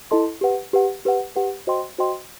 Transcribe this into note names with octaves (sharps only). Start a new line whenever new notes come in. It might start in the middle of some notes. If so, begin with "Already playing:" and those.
E4 A4 D#5 A5 C6
G4 B4 F#5
G4 B4 F#5
G4 B4 F#5
G4 B4 F#5
F#4 C5 D#5 G5 C6
F#4 C5 D#5 G5 C6